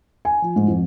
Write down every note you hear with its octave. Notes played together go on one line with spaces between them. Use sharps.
G#5
F3
G#2
F2